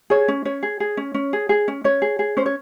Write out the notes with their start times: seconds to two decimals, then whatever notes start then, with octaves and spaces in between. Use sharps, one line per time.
0.10 G#4 C#5
0.28 C#4
0.45 C#4 C#5
0.63 G#4
0.80 G#4
0.97 C#4
1.14 C#4
1.33 G#4
1.49 G#4
1.68 C#4
1.84 C#4 C#5
2.02 G#4
2.19 G#4
2.37 C#4 C5
2.46 C#5